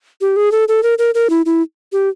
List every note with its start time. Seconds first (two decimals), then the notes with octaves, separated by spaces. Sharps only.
0.21 G4
0.36 G#4
0.52 A4
0.68 A4
0.83 A#4
0.98 A#4
1.15 A#4
1.30 E4
1.46 E4
1.92 G4